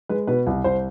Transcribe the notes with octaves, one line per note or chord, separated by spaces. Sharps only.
G#3 B4
B2 B4
C2
C2 C5